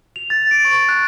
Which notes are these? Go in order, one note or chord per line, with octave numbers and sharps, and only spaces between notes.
F7
A6
D7
C#6
F#6